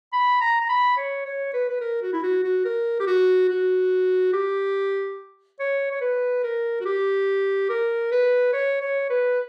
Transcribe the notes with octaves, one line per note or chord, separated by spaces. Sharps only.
B5
A#5
A#5
B5
C#5
C#5
B4
B4
A#4
F#4
E4
F#4
F#4
A#4
G4
F#4
F#4
G4
C#5
C#5
B4
A#4
F#4
G4
A#4
B4
C#5
C#5
B4